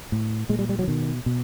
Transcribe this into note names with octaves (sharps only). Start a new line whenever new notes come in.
A2
A#2 G#3
G3
G3
F#3
E3
B2 D#3
B2